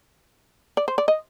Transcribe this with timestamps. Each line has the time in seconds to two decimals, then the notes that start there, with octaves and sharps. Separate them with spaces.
0.77 D5
0.88 C5
0.98 D5
1.08 D#5